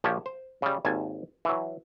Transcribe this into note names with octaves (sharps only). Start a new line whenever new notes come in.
A#1 F3 G4 C#5 A5
C5
C#3 G3
G#1 D#2 G#5 A5
E3 F#3